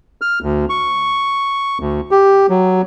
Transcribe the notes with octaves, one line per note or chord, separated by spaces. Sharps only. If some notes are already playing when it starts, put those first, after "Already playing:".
F6
D2
C#6
D2
G4
F#3